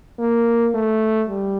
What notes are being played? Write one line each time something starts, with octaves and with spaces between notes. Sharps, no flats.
A#3
A3
G3